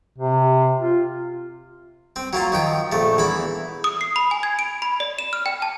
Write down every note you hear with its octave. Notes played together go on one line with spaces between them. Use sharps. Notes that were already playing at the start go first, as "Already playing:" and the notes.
C3
F4
C4
F#3 A#3 F4
D#3 F3 G5
A#1 A3
E2 E3 B5
D#6
C7
B5
G#5
G#6
D7
B5
D5
E7
F6
G5
A5